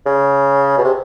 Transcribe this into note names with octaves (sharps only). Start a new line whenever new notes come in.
C#3
B2
C3